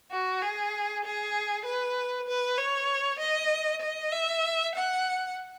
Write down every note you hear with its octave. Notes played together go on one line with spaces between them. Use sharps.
F#4
G#4
G#4
B4
B4
C#5
D#5
D#5
E5
F#5